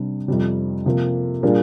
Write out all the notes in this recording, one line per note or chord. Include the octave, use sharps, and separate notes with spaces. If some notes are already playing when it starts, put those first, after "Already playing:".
Already playing: C3 G3 D4
F2 C3 G3
C3 F3 A#3
A#2 G3 A#3 D4 G#4